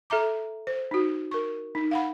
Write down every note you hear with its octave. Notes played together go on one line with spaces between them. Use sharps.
A4 E5 A#5 D6
C5
D#4 F#4
A#4 C#6
D#4
F5 F#5 B5